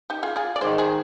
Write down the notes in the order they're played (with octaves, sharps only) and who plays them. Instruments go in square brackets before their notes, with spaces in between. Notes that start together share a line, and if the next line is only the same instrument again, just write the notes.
[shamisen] D#4 G4
F4 G#4
F4 G#4
D5
[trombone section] G#2 D#3 G#3 [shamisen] G#4 C5
[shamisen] G#4 C5